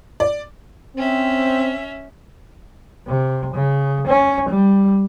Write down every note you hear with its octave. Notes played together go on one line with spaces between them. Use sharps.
D5
C4 C#4 E5
C3
C#3
C#4
G3